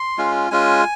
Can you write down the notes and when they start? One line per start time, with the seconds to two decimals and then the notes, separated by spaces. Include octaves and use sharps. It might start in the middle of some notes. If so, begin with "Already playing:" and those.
Already playing: C6
0.18 G#3 C#4 F4
0.51 G#3 C#4 F4 G#5